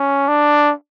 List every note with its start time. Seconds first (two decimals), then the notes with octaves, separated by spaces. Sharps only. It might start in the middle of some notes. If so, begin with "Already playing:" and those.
Already playing: C#4
0.28 D4